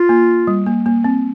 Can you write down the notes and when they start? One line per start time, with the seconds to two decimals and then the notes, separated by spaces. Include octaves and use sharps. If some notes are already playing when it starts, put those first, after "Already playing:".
Already playing: F4
0.09 A#3
0.47 G3
0.66 A#3
0.86 A#3
1.04 C4